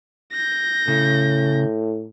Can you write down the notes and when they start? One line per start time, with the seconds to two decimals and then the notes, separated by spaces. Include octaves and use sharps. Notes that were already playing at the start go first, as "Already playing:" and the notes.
0.33 G6 A#6
0.88 A2 C#3